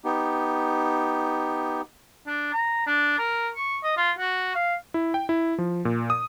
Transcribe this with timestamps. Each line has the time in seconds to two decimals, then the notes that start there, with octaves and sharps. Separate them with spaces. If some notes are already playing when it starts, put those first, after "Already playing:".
0.05 B3 D#4 G4
2.27 D4
2.53 A#5
2.87 D4
3.19 A#4
3.55 C#6
3.83 D#5
3.97 F4
4.19 F#4
4.55 F5
4.94 E4
5.14 G5
5.29 E4
5.58 F3
5.85 A#2
6.10 D#6